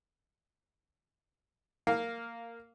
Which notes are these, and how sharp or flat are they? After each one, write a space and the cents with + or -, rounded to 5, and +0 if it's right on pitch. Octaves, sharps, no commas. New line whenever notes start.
A#3 -10 F5 +0